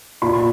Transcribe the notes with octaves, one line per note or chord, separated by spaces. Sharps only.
A#2 B5